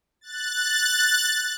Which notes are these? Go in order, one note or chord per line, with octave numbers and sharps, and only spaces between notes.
F#6 A6